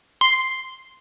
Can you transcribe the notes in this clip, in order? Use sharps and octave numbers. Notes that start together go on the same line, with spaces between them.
C6